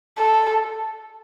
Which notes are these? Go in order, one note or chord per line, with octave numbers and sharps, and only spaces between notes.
A4